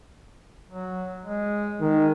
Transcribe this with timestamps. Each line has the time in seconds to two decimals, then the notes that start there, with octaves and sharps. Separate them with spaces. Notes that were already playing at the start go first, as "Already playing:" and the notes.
0.70 F#3
1.25 G#3
1.81 D#3 G#3